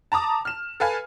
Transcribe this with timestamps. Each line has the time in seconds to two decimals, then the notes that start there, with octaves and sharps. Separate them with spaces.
0.12 A5 A#5 D6 D#6
0.45 F6 E7
0.80 A4 B4 F5 G#5